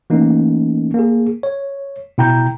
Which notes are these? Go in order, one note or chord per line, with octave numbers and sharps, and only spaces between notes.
E3 A3 A#3 C#4 D#4
A#3 G#4
C#5
B2 E4 G5 A#5 G6